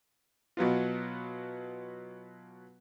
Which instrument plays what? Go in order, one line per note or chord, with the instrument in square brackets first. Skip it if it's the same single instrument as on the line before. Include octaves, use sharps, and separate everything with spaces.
[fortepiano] B2 F#3 B3 F4